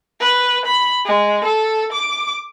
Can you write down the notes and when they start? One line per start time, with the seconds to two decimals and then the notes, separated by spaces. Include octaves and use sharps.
0.20 B4
0.66 B5
1.05 G#3
1.44 A4
1.93 D6